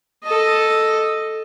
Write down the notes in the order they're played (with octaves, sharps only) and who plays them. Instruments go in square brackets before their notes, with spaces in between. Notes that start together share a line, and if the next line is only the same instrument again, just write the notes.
[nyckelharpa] A4 D#5